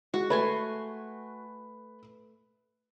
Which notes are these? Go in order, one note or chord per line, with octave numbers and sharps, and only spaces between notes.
G#3 F#4
A3 B4 G#5 B5 C6